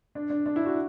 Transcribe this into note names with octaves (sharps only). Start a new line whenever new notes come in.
D4
D4
D4
E4
F#4